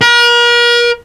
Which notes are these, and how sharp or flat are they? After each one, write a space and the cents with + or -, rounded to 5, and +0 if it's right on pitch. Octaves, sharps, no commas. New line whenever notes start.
A#4 +40